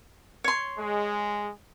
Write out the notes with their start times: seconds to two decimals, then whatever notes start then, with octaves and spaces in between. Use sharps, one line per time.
0.44 C#5 C6
0.77 G#3